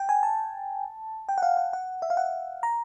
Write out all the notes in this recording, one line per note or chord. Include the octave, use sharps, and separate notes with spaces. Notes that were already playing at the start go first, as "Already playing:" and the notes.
Already playing: G5
G#5
A5
G5
F#5
F5
F#5
F#5
E5
F5
F#5
A#5